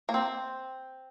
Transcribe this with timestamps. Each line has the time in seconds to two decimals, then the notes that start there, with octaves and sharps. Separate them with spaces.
0.09 A#3
0.14 C4